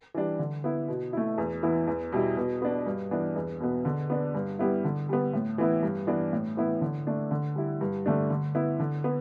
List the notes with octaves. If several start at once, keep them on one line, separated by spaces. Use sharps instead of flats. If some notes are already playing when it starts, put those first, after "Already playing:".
E3 G3 D4
D3
B3 E4
B2
A3 E4
E2
E3 B3 E4
E2
B2 G3 E4
B2
B3 D4
G2
E3 B3 D4
E2
B2 B3
D3
B3 D4
G2
G3 B3 E4
D3
G3 B3
A2
E3 B3 E4
G2
E3 B3 D4
A2
E3 B3 E4
D3
A3 D4
D3
G3 E4
G2
D3 A3 D4
D3
B3 E4
D3
B3